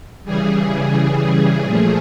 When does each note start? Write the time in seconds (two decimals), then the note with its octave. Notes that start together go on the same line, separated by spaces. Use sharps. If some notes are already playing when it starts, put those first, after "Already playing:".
0.24 C#3 E3 G3 G#4
1.63 A#2 F3 A3